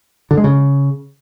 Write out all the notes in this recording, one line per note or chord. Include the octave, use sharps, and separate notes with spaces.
D3
G#3
C#3